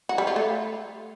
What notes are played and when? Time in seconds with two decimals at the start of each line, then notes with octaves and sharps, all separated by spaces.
0.09 F#4
0.18 G3
0.27 F4
0.36 A3